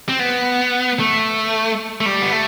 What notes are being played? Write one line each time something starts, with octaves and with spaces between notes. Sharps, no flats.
C4
B3
A3
A3
G3
B3
A3